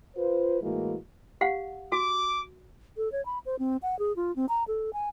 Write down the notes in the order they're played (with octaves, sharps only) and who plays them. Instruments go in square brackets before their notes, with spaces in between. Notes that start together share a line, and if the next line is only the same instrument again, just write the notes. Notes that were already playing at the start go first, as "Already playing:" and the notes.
[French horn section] F4 B4 C5
A2 E3 G#3 A#3 E4 F#4
[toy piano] G4 F5 F#5
[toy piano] F#4 [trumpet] D6
[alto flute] A4
C#5
B5
C5
C4
F#5
G#4
F4
C4
A#5
A4
G#5